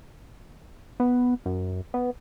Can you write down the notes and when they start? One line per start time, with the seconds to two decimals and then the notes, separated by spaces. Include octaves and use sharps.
1.00 B3
1.46 F#2
1.94 B3